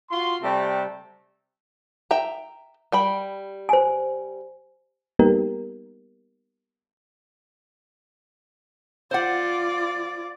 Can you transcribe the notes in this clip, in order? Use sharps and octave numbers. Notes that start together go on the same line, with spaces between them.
F4 F#4 C6
C3 G3 A3
E5 G5 A#5
G3 G5 B5
C5 G#5
G3 A#3 B3 D#4 G4 A#4
F4 C5 D5 F#5